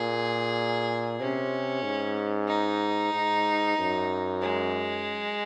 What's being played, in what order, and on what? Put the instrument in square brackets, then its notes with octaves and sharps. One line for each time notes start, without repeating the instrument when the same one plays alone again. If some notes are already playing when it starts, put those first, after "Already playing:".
Already playing: [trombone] A#2 [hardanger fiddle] G#4
[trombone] C3 [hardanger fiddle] C#4
[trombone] G#2
[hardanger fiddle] D#4
[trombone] G#2
F#2
[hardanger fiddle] G#3